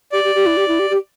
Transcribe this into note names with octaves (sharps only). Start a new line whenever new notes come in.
G4 D5
G4
G4
E4
G4
E4
G4
G4